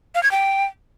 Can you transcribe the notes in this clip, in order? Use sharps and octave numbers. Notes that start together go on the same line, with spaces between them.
F5
G#6
G5